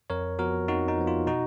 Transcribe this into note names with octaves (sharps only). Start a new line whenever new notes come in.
F2 A#4 C#5
F3 B3 F#4 A#4
F2 D#4 F#4
D#4
F3 B3
F4
B2 D#4 F#4